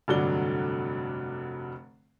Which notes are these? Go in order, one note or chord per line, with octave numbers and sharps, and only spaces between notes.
F1 G2 D3 F#3 D5 G7